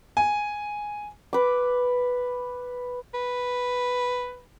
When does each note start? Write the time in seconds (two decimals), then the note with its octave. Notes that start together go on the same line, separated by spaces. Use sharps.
0.17 G#5
1.33 B4 D6
3.14 B4